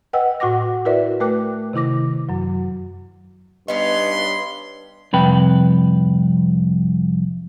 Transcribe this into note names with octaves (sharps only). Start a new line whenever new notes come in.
B4 D#5 F#5 G5 E6
A2 F#4 F#5 D6 A#6
E4 F#4 A#4 B4 D5 E5
A3 A#4 B4 G5 D6 F#6
C3 D#3 E4 D6 A#6
F#2 F#3
G2 B3 C#4 D#4 D#5 B5 C6
C2 F2 B4 G5